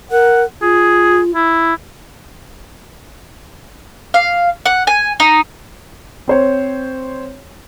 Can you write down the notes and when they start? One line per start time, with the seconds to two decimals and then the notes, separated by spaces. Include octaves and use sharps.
0.11 A#4 F#5
0.62 F4 G#4
1.35 E4
4.14 F5
4.66 F#5
4.87 G#5
5.20 D#4
6.28 C4 C5 C#5